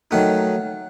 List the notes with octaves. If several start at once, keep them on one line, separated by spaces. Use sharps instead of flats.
D#3 F#3 A3 D#4 F#5